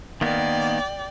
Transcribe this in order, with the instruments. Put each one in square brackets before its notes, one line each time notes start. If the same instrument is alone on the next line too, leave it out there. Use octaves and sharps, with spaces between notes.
[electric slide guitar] D#3 A#3 B3 [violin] D5 G5